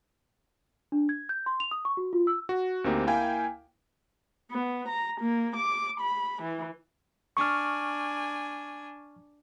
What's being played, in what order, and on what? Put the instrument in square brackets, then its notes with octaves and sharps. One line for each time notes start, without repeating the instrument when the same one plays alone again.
[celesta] D4
G#6
G6
C6
F7
D#6
C#6
F#4
F4
E6
[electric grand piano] F#4
D2 A#3 C4 D#4 G4
A#3 E4 F5 G5 G#5
[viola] B3
A#5
A#3
D6
B5
E3
[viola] D4 G#5 [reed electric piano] C#6 F6